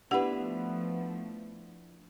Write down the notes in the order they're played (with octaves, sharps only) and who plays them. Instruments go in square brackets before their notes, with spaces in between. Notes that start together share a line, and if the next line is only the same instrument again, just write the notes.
[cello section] F3 A3 [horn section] B3 [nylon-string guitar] D4 E4 B4 [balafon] G4 F#5